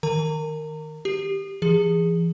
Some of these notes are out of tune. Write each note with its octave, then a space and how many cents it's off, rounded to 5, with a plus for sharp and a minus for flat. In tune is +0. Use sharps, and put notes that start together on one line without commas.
D#3 +0 A#4 -15 A#5 -35
G4 +0 D#6 -30
E3 +40 G#4 -15